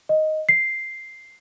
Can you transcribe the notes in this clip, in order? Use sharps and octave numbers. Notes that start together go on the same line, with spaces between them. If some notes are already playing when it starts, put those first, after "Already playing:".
D#5
C7